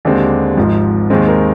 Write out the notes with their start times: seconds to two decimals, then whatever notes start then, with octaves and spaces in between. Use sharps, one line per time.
0.05 D#2 D3 G#3 C4 G4
0.57 G#1 G#2 F3
1.10 D#2 D#3 G#3 C4 G#4
1.28 A#4